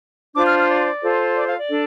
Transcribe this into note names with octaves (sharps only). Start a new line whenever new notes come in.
D4 F4 C5 D6
F6
F6
D5
F4 A4 C5
D5
F5
D5
D4 A4